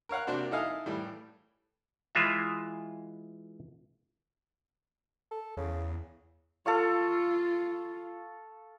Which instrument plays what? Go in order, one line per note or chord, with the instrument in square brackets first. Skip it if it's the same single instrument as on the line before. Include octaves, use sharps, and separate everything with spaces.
[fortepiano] A#4 C#5 F5 F#5
C3 A#3 D4 F#4 C5
D#4 E4 A4 D#5 F5 G#5
A2 E3 G3
[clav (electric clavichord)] E3 G#3 F4 E5
[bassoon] A4
[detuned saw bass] E2 [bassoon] C#3
[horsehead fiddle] F4 [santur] A4 F5 C#6